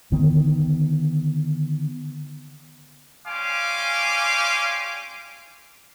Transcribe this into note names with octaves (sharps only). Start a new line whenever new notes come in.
D3 D#3 B3
G3 C#4 F5 G#5 C6 D6